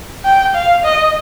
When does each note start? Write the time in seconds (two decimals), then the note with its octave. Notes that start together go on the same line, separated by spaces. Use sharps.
0.25 G5
0.55 F5
0.84 D#5